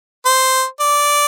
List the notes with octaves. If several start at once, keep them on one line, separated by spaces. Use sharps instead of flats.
C5
D5